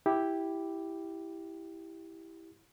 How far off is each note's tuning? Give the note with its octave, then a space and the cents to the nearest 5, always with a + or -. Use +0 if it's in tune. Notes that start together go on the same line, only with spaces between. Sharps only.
E4 +0 G4 +0